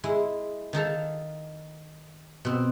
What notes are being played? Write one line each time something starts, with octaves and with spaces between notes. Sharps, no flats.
G#3 E4
D#3 D#4 A4 F5
B2 C4